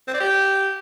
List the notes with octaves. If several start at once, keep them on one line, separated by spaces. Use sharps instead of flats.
C4
D5
G4